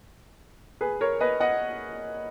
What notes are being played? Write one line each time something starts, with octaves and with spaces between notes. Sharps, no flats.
G#4 B4
A#4 C#5
B4 D#5
D#5 F#5